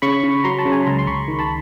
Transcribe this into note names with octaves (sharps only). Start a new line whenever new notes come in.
C#3 B5 C#6
C#3
F#3 A#5 C6
A5 B5
C#3
G#5 A#5
C#2 A#5 C6
C6
C#2 B5 C#6
D#3
A5 B5